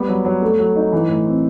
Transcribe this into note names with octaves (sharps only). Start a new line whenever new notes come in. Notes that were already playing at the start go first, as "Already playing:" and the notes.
Already playing: G3 B3
F#3
F#3
A3
F#3
D#4
E3
A2
C4